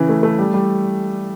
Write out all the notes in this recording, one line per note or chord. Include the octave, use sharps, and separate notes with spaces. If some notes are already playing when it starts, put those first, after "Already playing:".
Already playing: C#3 E3
A3
A3
G3
G3